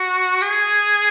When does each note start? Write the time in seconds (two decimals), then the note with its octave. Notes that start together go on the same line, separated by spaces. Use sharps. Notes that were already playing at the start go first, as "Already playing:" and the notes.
Already playing: F#4
0.42 G#4